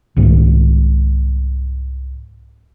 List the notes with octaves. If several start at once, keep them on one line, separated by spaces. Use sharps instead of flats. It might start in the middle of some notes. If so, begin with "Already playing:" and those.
C2 G#2 D#3 G#3